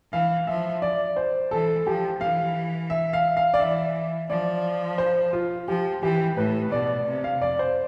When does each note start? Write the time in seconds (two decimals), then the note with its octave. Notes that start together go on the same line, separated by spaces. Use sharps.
0.12 E3 F5
0.47 F3 E5
0.82 D5
1.16 C5
1.51 E3 A4
1.86 F3 G4
2.21 E3 F5
2.90 E5
3.13 F5
3.37 F5
3.54 D5
3.59 E3 E5
4.30 F3 D5
4.98 C5
5.33 F4
5.68 F3 G4
6.03 E3 G4
6.37 A2 B4
6.72 B2 D5
7.06 C3
7.24 F5
7.42 F2 D5
7.59 C5